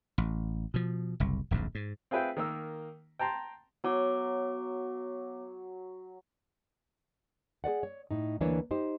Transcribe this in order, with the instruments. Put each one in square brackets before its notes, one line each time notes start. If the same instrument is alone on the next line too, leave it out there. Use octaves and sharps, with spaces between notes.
[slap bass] A1
B2 F3
F#1 C2
D1 A#1 F2 G#2
G#2
[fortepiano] C4 F4 G#4 B4 E5 G5
D#3 A#3 E6
G5 A5 A#5 C6
[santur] F#3 [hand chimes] B3 C#5 D6
[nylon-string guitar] G#4 B4 D5 F#5
C#5
A2 D#4
D2 E3 A#3 D4 B4 C#5
D#4 G4 C5